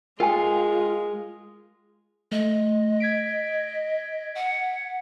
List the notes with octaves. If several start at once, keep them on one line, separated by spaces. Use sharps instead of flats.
G#3 F4 A#4 G5 G#5
A3 D#5
G#6 B6 D7
F#5